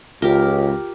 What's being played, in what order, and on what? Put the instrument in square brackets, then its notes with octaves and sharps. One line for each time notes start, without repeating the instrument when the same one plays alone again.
[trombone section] C#2 [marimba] F4 [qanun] G4 A#4